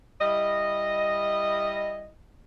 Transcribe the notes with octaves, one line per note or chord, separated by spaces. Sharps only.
G3 E4 D#5